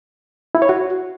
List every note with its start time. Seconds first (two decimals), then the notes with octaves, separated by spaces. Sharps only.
0.55 E4
0.62 C#5
0.69 F#4